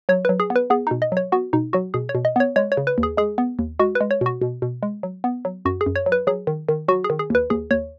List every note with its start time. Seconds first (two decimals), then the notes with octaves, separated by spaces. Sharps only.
0.09 F#3 C#5
0.25 F#3 B4
0.40 G#4
0.50 B3
0.56 B4
0.70 B3 G#4
0.87 B2 D#4
1.02 D#5
1.12 F#3 C#5
1.32 B3 F#4
1.53 B2 D#4
1.73 F#3 F#4
1.94 B2 G#4
2.09 C#5
2.15 B2
2.25 D#5
2.36 B3 C#5
2.56 G#3 C#5
2.72 C#5
2.77 C#3
2.87 B4
2.98 D#2
3.03 G#4
3.17 G#3 G#4
3.38 B3
3.59 D#2
3.79 G#3 F#4
3.95 B4
4.01 G#3
4.11 C#5
4.21 B2 F#4
4.42 B2
4.62 B2
4.83 G#3
5.03 F#3
5.24 B3
5.45 F#3
5.65 F#2 F#4
5.81 G#4
5.86 F#2
5.96 C#5
6.06 F#3
6.12 B4
6.27 F#3 G#4
6.47 D#3
6.69 D#3
6.88 F#3 F#4
7.04 G#4
7.10 D#3
7.19 G#4
7.30 D#2 B4
7.50 D#2 G#4
7.71 D#2 C#5